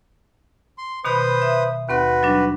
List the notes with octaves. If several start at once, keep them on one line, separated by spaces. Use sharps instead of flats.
C6
B2 D#3 B4 C5 B5 D#6
E5
D#2 C4 F#4 B4 C6
F#3 G3 D4